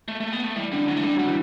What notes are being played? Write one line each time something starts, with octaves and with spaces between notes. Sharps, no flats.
A3
A3
B3
A3
E3 G3
D3 G3
E3 F#3
A3
D3 G3
F#3 G3
E3